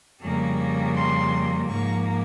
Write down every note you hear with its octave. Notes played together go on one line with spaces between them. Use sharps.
F2 C#3 G3 A#3
C6
G#2 F3 A#3 C#6